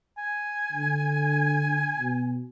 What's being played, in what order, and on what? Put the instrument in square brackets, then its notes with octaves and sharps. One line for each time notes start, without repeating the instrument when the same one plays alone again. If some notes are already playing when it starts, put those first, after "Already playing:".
[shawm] G#5
[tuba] D3
B2